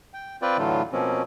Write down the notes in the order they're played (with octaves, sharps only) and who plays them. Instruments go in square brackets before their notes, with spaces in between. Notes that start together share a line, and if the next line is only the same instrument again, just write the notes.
[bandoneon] G5
C4 F4 B4 D5 G5
A2 D3 E3 F#3 A3 F4
B2 F3 A#3 C4 C#4